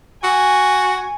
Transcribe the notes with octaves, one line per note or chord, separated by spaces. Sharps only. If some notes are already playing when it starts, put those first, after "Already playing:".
F#4 G#5